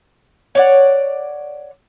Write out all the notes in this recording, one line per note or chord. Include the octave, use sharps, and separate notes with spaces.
C#5 D5 F#5